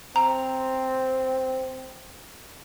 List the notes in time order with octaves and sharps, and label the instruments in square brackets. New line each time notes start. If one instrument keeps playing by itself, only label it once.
[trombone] C4 [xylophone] A#5